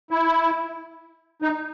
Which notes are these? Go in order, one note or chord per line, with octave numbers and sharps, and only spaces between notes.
E4
D#4